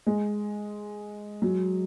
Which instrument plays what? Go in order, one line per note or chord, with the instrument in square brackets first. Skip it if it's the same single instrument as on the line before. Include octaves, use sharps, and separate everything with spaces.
[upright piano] G#3
F#3